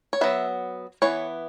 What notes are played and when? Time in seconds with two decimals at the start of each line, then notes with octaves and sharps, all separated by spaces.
0.13 C#5
0.21 F#3 B3 E5
1.02 E3 B3 C#5